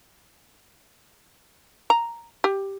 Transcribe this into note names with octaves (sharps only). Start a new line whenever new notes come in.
A#5
G4